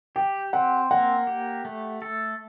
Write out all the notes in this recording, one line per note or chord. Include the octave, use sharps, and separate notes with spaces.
G4 G5
C4 F#5
A#3 F#5
G4
A3
A4